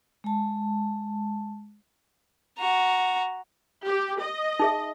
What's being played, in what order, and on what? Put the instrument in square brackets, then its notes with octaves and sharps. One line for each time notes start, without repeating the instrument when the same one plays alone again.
[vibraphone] G#3 A5
[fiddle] F#4 A#5
[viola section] G4
D#5
[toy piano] D#4 G#4 E5